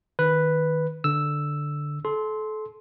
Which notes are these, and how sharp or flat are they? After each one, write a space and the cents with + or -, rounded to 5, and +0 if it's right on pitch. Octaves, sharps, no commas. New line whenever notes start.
D#3 +0 B4 +0
D3 +0 E6 +0
A4 -30 C6 +0